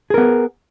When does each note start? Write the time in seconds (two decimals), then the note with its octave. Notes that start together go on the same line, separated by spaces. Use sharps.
0.10 G#4
0.14 A#4
0.18 B3